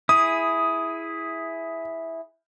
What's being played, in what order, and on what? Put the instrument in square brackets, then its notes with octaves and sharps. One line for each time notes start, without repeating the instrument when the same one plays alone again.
[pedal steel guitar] E4 G#4 [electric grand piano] D#6